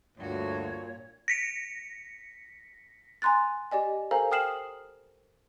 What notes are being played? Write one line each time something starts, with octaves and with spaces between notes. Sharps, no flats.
D2 G2 A#2 F#4 C#5
A#6 B6 C#7
G#5 A#5 C6 F#6 A6
G4 D5 D#5 G#5
A4 A#4 C5 F5 G#5 A#5
G5 D#6 F6 C7 E7 F#7